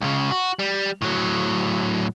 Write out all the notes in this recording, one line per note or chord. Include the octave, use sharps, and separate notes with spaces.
C#2 C#3
F#4
G3
A2 F#3